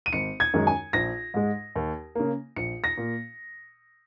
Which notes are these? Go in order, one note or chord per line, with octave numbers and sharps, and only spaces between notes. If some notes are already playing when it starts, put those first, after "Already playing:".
D#7
G#1 C#7
G#6
F#2 D#3 G#3
G#5
A#1 A#6
G#2 G#3
D#2
C#3 A#3
A#1 C#7
A#6
A#2